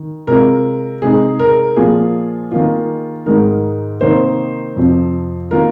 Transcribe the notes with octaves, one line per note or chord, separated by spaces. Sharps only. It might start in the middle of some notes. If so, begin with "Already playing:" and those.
Already playing: D#3
C3 G#3 F4 A#4
C3 G#3 D#4 G#4
A#4
A#2 F3 A#3 F4 G#4
D#3 A#3 F4
G#2 D#3 G#3 D#4 A#4
C3 D#3 A#3 D#4 C5
F2 C3 F3
D#3 A#3 F4 A#4